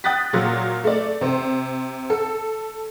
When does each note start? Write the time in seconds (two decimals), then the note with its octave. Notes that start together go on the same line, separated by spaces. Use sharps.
0.04 G5 D#6 F#6 A6 B6
0.33 A#2 F#3
0.84 A3 D5
1.21 C3 C5
2.10 A4